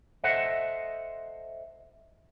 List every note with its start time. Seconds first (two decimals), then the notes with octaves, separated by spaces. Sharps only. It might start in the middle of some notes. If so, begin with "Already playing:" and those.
0.24 A4 C5 D#5 E5 F#5